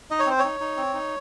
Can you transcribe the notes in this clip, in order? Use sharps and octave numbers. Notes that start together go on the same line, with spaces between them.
D#4 D#5
C#5
C4 C5
C#5
D#4
D#4
C4
D#4